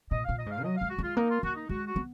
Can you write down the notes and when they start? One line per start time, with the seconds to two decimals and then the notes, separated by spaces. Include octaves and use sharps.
0.11 A#2 D#5
0.25 A#2 F5
0.38 D#5
0.46 G#2 F5
0.63 F#3 D#5
0.77 F5
0.81 G#3
0.90 F#4
0.98 G#3 F4
1.16 A#3 D#4
1.30 F4
1.43 A#3 F#4
1.55 D#4
1.69 G#3 F#4
1.87 F#4
1.96 B3